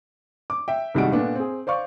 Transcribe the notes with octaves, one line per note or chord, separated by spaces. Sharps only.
D6
E5 G5
C2 D#3 G3 G#3 F#4 D7
A#2 A3 B3 D4
C4 G#4
C5 D5 F5 C#6